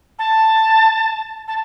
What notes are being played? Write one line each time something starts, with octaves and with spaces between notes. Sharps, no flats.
A5
A5